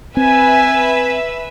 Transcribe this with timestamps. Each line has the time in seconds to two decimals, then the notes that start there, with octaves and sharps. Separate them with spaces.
0.17 C4 B4 E5 G#5